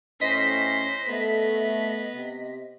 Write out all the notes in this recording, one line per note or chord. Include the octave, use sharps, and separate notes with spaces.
A2 C#4 C5 D#5 A#6 B6
A3 B3
C3